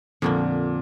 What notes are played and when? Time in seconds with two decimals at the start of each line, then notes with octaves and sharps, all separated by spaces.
0.22 F2 A#2 D3 A#3